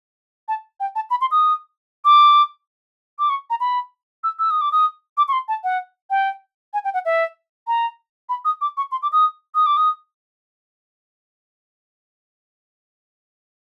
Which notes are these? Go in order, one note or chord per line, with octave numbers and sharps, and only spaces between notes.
A5
G5
A5
B5
C6
D#6
D6
D6
C#6
A#5
B5
E6
E6
D#6
D6
D#6
D6
C#6
C6
A5
F#5
G5
G#5
G5
F#5
E5
A#5
B5
D#6
D6
C#6
C6
D6
D#6
D#6
D6
D#6